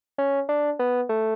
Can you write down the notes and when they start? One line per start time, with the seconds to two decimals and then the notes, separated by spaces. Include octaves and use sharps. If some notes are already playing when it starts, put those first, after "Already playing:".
0.18 C#4
0.49 D4
0.79 B3
1.09 A3